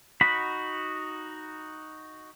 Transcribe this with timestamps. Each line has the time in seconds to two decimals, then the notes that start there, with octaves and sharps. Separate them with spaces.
0.21 D#4 F#4 F#5 B5